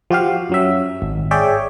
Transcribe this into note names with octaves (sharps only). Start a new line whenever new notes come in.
F3 F#4 G4 F5
F#2 F#3 E5
G#1
G#4 C#5 D5 E5 G5